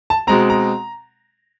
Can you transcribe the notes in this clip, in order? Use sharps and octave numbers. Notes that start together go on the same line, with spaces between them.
A5
B2 G#3 C4 A#5
A#5